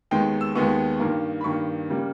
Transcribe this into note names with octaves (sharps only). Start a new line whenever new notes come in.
D#2 D#3 G#3 B3 G5
E6
D#2 D#3 G#3 B3 C#6
G2 D#3 A#3
B5
G2 D#3 A#3 C#6
C#3 G3 A#3